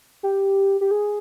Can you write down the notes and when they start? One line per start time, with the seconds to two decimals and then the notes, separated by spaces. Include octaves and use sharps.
0.23 G4
0.81 G4
0.91 G#4